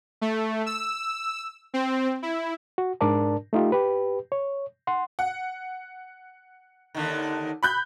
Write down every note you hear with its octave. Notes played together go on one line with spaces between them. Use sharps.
A3
E6
C4
E4
F#4
G#2 D4 A#4 D5 A5
A3 D#4 F4 G4
G4 B4
C#5
F#5 C6
F#5
D#2 D3 D#3
B5 F#6 G6